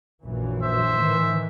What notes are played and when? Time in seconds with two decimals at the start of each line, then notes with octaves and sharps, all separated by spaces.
0.23 A#1 F#2 E3
0.62 C5 E5
0.95 A2 D#3 E3